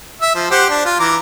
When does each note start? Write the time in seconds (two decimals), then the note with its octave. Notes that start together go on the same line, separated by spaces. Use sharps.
0.21 E5
0.35 F3
0.51 G4 C5 F#5
0.70 D4
0.85 F4
1.00 E3 A#5 D6